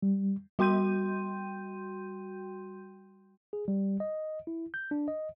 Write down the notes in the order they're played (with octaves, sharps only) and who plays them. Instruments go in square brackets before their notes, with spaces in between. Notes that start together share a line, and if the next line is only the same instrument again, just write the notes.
[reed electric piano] G3
[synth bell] G3 F#4 G5 C6 G6 D#7
[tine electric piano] G#4
G3
D#5
E4
G6
D4
D#5